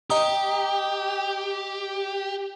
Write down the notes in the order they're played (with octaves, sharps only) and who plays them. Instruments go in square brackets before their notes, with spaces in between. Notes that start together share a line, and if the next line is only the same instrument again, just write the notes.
[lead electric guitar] G4 [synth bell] D#5 A#5 D#6